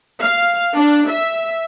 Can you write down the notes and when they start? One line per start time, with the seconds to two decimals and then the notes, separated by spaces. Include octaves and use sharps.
0.21 F5
0.77 D4
1.08 E5